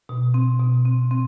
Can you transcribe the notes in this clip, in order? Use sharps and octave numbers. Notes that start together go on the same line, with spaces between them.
B2
C4
B2
C4
C4